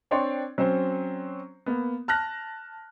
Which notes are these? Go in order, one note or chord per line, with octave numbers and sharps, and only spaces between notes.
C4 D4 C#5 D5 G5 C6
F#3 C4 C#4 C5
A#3 B3
A5 F6 F#6 A#6